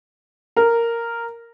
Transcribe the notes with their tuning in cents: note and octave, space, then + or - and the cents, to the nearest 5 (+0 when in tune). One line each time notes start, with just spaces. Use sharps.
A#4 -5